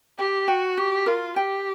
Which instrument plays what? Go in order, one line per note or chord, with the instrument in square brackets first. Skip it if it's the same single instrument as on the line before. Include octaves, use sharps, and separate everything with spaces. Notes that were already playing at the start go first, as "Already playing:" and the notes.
[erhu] G4 [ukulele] G5
[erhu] F#4 [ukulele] G5
[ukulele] F#4 [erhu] G4
[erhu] F4 [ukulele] A#4
[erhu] G4 [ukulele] G5